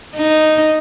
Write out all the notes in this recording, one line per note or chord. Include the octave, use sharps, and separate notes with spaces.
D#4